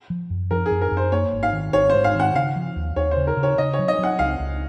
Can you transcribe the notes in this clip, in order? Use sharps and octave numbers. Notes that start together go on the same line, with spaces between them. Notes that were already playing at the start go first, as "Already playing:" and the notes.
F3
F#2
F3 A#4
G#4
F#2
A#4
F#2
C5
A#3 C#5
G#1
F5
D#3
G#1 C#5
G#2 C5
F5
D#3 F#5
C#3 F5
F3
D#2
D#2 C#5
C5
C#3
A#4
C#3
C#5
C#3 D#5
C#5
F#3
D#5
F#3 F#5
C#2 F5
C#2